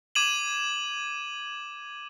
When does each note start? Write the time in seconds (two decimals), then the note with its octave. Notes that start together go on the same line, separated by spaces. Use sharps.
0.15 D6 G#6 D#7 E7 F#7